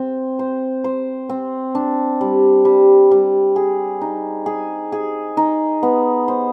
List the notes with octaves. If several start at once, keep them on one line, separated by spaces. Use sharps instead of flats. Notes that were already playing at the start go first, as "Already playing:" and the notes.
Already playing: C4
C5
C5
C4
D4
G3
G3
G3
G#4
D#4
G#4
G#4
D#4
B3
C5